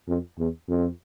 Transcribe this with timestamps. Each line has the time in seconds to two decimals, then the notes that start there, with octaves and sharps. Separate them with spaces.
0.08 F2
0.38 E2
0.69 F2